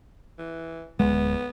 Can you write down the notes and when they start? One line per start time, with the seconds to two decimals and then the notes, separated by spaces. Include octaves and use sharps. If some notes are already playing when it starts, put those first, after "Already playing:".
0.38 E3
1.00 D1 G#3 B3